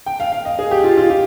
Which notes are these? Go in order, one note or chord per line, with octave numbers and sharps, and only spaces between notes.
G5
F5
F5
D#5
G#4
G4
F4
F4
G4